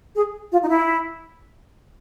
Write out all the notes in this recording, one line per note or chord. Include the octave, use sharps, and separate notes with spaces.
G#4
F4
D#4
E4